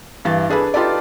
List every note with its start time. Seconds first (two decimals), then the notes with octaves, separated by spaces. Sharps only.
0.25 G2 E3 F5 A6
0.49 D4 G#4 A4 B4
0.74 D#4 F4 G4 A4 B4 D5